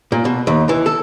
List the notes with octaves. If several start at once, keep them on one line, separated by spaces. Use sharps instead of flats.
A#2
B2
D#2
E3
A4